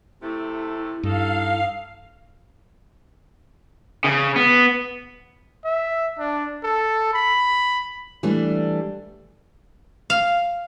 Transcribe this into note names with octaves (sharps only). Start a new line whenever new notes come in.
C3 A3 E4
G2 D#4 A4 F5
C#3
B3
E5
D4
A4
B5
E3 G3 A3 D4
F5